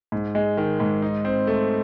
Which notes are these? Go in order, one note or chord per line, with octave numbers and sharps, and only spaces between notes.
G#2
G#3
D#3
G#2
D#4
C4
A3